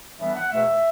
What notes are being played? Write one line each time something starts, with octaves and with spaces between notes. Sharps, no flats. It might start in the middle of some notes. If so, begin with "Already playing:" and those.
A2 E3 G3 B3 D4 E5
F#5
E2 B2 A3 E5